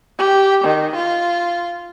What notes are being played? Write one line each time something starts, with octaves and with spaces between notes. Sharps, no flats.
G4
D#3
F4